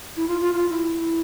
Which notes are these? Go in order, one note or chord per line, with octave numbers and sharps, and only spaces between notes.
E4
F4
F4
F4
E4